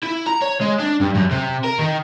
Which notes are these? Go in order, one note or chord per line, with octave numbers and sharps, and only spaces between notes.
E4
A#5
C#5
G#3
D4
G2
F#2
C3
A#4
D#3